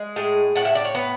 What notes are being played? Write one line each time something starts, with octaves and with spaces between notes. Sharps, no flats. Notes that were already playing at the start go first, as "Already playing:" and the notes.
Already playing: G#3
A2 G#4
A2 F#5
E5
D5
C#5
B3 B4